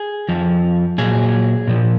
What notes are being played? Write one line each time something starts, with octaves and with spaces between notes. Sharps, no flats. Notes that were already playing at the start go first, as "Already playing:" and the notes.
Already playing: G#4
F2 F3
A#2 F#3 G#4
A#2 F3